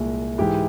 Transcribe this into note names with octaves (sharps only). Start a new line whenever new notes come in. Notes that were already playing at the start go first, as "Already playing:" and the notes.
Already playing: C2 A#2 G#3
G#2 E3 G#3 E4 G4